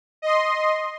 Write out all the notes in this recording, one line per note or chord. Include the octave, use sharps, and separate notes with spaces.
D#5 C6